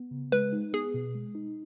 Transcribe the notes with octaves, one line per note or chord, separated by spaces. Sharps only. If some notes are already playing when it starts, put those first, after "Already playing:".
Already playing: B3
C#3
G#3 B4
D#4
B3 G#4
B2
G#3
D#4